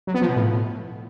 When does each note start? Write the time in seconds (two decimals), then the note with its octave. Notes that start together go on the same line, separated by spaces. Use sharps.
0.07 F#3
0.14 B3
0.22 F3
0.29 B2
0.36 A2